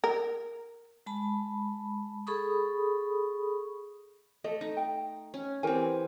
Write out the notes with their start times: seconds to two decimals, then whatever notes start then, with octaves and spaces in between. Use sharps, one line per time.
0.04 A#4
1.06 G#3 A5 B5
2.27 G#4 A4 B5 C#6 D#6
4.44 A3 A4 D#5
4.61 D#4
4.77 G5
5.34 C#4
5.63 E3 C4 G4 A#4 G#5